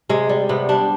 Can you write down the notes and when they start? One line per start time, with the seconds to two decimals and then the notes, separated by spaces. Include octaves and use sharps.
0.09 C3 G#3
0.29 G3
0.49 C3 B3
0.69 G3 D4